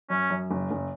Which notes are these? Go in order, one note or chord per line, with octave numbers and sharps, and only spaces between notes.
F#2 C#4
F#2
F#1
F#1